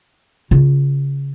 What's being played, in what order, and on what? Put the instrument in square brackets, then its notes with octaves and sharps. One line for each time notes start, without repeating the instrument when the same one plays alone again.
[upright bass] C#3 F4